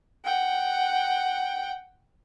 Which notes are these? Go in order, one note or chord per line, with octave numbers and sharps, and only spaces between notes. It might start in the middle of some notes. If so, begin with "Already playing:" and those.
F#5 G5